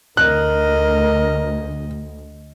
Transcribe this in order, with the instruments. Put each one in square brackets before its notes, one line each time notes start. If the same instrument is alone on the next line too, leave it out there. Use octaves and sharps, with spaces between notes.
[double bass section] D2 [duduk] A#4 [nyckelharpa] D#5 [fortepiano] F#6